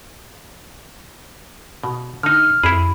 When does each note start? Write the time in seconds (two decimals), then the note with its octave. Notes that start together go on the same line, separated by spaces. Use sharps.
1.83 B2
2.23 D3 D#4 F6
2.63 F2 E4 G#4 B5